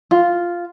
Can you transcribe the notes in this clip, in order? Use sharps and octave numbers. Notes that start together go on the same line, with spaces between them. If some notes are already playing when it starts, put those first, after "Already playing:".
F4